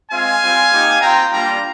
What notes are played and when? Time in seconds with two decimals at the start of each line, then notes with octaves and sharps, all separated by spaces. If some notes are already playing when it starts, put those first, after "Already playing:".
0.11 G#3 C4 F4 F5 G#5
0.41 G3 C4 F4
0.71 A#3 D#4 G4
1.01 C4 F4 G5 A#5
1.32 G3 A#3 D4 F4 G5 A#5